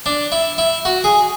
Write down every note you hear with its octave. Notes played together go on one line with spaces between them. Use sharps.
D4
E4
E4
F#4
G#4